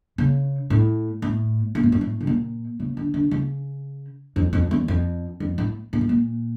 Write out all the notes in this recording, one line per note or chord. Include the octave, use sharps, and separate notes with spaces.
C#3
A2
A2
A#2
A2
G2
A2
C#3
A#2
C#3
D3
D3
C#3
F2
F2
E2
F2
F2
A2
A#2
A2
A#2